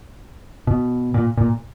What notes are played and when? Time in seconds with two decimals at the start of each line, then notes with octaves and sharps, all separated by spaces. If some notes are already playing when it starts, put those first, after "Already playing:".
0.67 B2
1.14 A#2
1.37 A#2